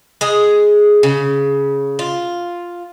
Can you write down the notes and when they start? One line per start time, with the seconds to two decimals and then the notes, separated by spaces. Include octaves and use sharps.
0.21 G#3 G#4
1.03 C#3
1.99 F4